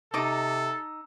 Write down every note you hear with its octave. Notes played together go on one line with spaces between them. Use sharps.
C3 D#4 A4 A#5 D6 E6